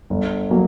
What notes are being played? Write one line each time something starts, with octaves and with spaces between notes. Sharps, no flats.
G1
F#3 A#3